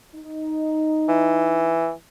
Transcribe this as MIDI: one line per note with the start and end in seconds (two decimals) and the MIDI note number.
0.16 1.78 63
1.09 1.91 52